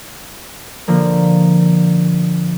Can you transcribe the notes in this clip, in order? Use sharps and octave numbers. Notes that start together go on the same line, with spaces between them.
D3 F3 A#3